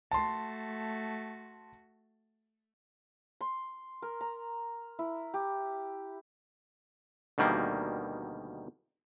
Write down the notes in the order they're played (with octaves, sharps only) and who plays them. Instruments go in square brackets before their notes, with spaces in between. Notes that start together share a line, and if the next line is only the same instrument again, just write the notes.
[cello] A3 F#4 [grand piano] A5 C6
[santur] C6
A#4
A#5
E4
G4
[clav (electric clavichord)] D2 B2 D#3 G3 A#3